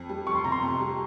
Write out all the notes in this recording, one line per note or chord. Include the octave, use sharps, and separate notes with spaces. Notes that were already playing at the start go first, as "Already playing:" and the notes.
Already playing: F2
G3
F1 C#6
C6
C3 A#5
C6
F2 A#5
G3